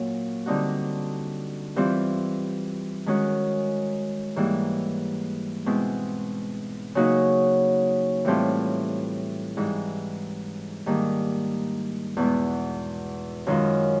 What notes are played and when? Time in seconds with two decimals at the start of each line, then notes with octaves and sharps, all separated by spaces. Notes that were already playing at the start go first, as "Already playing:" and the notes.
Already playing: A#2 F#3 A#3 C#4
0.46 D3 G3 C4 D#4 F#4
1.76 E3 G3 C4 F4
3.06 D#3 G#3 C#4 F#4
4.36 G#2 E3 G3 A#3
5.66 B2 G#3 C4 E4
6.95 C#3 F#3 A#3 D#4 F#4
8.25 A2 E3 G3 C4 F4
9.57 G#2 E3 G3
10.86 G#2 D#3 G3 A#3 D4
12.17 E2 B2 G#3
13.47 F#2 D#3 G#3 C#4 F4